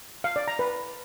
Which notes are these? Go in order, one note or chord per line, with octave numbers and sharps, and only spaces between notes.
F5
D5
A#5
B4